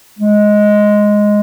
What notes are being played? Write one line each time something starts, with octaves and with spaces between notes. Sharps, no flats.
G#3